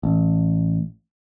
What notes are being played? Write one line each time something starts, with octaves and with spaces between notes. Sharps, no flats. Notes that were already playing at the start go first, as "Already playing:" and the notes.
A1